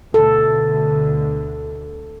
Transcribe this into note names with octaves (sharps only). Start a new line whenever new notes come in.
D2 B2 D3 A4